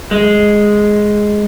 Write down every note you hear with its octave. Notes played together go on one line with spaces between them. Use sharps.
G#3